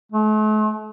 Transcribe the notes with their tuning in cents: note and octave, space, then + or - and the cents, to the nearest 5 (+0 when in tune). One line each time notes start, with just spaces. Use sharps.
A3 -45